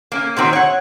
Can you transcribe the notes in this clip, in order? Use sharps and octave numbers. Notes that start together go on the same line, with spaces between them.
A#3 C#4
A#2 D3 D#3 F#3 C4
C#5 F#5